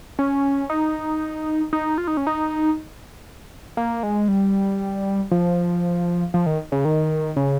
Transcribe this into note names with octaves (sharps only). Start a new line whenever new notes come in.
C#4
D#4
D#4
F4
D#4
C#4
D#4
A#3
G#3
G3
F3
F3
D#3
C#3
D#3
C#3